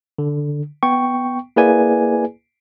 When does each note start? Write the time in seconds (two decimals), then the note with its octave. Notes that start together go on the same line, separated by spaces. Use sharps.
0.18 D3
0.83 B3 G5 C#6
1.56 A#3 E4 G#4 B4 D5 G#5